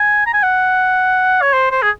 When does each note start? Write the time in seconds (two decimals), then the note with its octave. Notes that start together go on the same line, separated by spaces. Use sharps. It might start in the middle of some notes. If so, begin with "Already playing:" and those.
Already playing: G#5
0.26 A#5
0.33 G#5
0.43 F#5
1.41 C#5
1.53 C5
1.71 C5
1.82 G#4